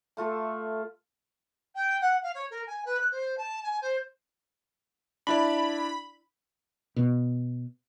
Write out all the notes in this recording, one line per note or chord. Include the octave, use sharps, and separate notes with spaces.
A3 F4 A4 E5
G5
F#5
F5
C#5
A#4
G#5
B4
F#6
C5
A5
G#5
C5
D4 E4 D5 B5
B2